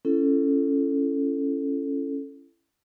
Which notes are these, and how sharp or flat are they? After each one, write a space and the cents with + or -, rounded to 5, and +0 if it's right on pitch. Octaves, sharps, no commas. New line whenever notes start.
C#4 +0 E4 +30 A4 +0